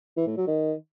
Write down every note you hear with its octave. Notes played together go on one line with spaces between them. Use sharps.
E3
A2
F#3
D#3